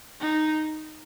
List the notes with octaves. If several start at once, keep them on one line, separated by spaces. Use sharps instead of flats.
D#4